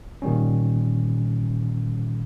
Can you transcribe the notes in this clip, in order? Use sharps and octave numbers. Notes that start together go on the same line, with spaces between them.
A#2 D#3 G3 C#4